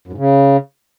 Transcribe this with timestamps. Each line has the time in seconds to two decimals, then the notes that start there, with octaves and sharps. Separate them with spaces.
0.08 F#2
0.13 G#2
0.18 C#3